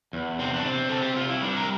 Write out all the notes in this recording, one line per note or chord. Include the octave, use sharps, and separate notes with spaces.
E2
C3 C4
D4
C3 C4
C3 A4
G4
C3 F4
E4
G3 D4
A#4